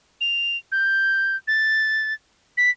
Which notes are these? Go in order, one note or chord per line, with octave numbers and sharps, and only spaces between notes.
F7
G6
A6
B6